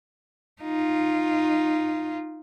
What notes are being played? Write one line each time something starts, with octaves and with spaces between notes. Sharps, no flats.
D#4 F4